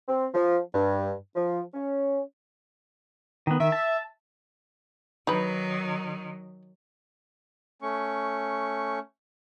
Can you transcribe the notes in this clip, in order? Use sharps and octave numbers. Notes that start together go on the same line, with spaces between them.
C4
F3
G2
F3
C#4
D#3 B3
D#3 E5
A5
D#3 F#3 D#4 B4
A3 C#4 C#6